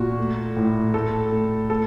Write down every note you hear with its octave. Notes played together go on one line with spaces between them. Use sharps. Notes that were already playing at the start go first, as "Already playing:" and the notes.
Already playing: A#2 F#4
A3
A2
A3 A4
A3
A3 A4